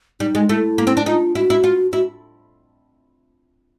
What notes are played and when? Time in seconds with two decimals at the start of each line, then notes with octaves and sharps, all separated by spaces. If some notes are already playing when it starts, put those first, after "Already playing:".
0.20 G3 D#4
0.35 G#3
0.49 A3 E4
0.78 A#3
0.87 C4
0.97 D4
1.06 D#4 F4
1.35 E4 F#4
1.50 E4
1.64 F4
1.92 E4 F#4